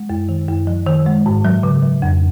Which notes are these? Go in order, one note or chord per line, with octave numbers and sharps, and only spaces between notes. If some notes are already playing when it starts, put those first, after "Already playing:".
Already playing: G#3
F#2
D#3
F#2
F3
D#3
G#3
G#2
F#3
C#3
F#3
F2